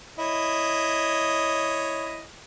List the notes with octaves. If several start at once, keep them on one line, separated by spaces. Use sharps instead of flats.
E4 C#5 D#5